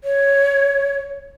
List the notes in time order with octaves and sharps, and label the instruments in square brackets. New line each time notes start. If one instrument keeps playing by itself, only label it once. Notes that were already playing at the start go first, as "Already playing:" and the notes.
[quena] C#5